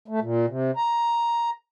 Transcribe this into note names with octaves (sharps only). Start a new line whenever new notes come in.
A3
A#2
C3
A#5